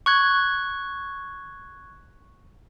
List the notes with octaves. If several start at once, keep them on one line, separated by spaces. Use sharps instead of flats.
C#6 F#6 G#6